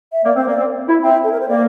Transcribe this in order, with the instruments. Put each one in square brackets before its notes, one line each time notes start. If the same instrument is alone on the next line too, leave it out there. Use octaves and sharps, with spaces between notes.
[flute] E5
[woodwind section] A#3 [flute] D5
[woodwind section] C4 [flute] C5
[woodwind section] A#3 [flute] D5
[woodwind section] C4
E4
[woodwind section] C4 [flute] E5
[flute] A4
A#4
C5
[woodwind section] A#3 [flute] D5